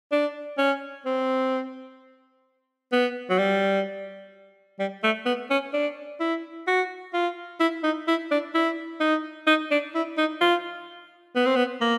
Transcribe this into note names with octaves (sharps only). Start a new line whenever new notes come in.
D4
C#4
C4
B3
F#3
G3
G3
A3
B3
C#4
D4
E4
F#4
F4
E4
D#4
E4
D4
E4
D#4
D#4
D4
E4
D#4
F4
B3
C4
B3
A#3